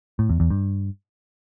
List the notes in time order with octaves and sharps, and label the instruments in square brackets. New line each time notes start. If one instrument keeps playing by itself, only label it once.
[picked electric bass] A2
E2
E2
G2